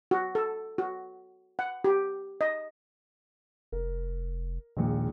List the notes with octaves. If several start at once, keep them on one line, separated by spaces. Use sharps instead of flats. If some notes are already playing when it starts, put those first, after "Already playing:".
F#4
A4
F#4
F#5
G4
D#5
F1 A#4
A#1 D#2 A#2 G#3